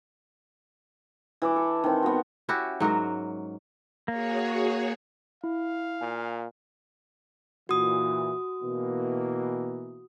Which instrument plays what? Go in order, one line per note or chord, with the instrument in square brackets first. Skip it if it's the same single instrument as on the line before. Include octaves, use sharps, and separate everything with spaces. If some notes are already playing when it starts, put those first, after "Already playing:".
[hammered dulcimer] E3 E5 D6
A4
D#3 C4
B3 F#4
[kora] C#4 E4 F#4 G4
G#2 F#3 F#4 A#4
[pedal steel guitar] A#3 [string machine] F#4 G#4 C#5
[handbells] E4 [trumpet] F5
[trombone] A#2 [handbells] G#5
[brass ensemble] A#2 E3 [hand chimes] F#4 D#6
[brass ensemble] B2 E3 A#3